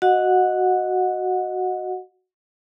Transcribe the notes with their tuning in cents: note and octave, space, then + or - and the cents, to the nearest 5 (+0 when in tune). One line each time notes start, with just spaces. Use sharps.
F#4 +0 D#5 +0 F#5 -20